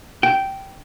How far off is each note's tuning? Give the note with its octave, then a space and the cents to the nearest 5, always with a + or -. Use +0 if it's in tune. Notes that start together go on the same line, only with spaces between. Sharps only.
G5 -10